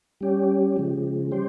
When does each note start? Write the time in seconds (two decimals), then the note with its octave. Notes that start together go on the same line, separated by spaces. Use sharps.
0.21 G3 C#4 G4
0.76 C#3 F3 G#3
1.32 G3 C#4 G4 C5